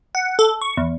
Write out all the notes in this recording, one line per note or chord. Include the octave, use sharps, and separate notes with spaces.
F#5
A4
C#6
E2